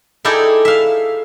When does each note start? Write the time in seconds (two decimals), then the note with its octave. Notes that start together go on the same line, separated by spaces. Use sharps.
0.25 D#4 E4 G#4 A4 D5 G5
0.65 E5 F5